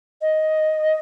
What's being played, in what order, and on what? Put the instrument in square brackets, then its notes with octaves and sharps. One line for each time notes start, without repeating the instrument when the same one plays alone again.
[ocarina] D#5